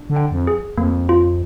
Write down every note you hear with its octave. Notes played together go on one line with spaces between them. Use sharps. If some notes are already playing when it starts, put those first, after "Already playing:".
Already playing: D4
D3
G5
F2
G#4
F2 A#3
F4